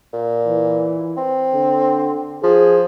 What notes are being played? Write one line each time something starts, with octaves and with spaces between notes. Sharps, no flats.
A#2
E3
C4
D3
F3 G#4